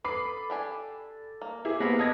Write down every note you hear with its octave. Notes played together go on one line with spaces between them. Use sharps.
A4 B4 B5 D6 C7
D4 G4 G#5
A#3
E4 G4 G#4
F3 A#3 B3 F#4 B4
B3 A4 D#5 D#6 G#6 A#6